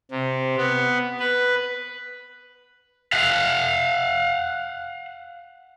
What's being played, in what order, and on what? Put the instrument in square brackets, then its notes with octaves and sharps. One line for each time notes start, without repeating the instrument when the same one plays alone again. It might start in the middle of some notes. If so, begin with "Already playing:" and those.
[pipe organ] C3
B3
B4
[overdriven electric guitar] F5 F#5